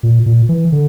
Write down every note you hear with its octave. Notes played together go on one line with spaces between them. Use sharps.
A#2
A#2
E3
D3